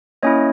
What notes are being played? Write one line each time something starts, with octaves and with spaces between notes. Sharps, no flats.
A#3 C#4 E4 C#5 D#5